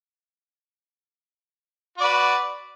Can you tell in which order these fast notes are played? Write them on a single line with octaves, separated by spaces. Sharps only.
F#4 D5 B4